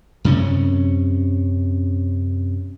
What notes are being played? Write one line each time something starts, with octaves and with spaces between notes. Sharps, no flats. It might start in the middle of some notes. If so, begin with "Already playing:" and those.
F#2 C3 C#4